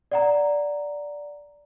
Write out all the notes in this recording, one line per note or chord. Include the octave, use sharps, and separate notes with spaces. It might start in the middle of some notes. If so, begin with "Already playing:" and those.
D5 F#5 A#5